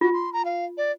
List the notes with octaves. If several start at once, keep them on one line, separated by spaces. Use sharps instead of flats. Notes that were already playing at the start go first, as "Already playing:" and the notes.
F4 F#4
C6
A#5
F5
D5